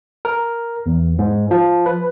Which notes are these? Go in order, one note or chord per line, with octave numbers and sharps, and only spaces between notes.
A#4
E2
G#2
F3
B4